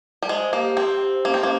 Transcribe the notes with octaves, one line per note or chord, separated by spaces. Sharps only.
G3
G#3 C5
A#3 G4
C4 G4
C5
A#3 C#4
C4
A#3